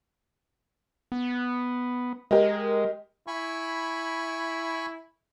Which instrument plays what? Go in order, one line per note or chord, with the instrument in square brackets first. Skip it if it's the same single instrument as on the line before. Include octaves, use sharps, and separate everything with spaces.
[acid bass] B3
[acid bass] G#3 [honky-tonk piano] G4 A#4 D#5
[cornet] E4 [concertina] G#5 B5 C#6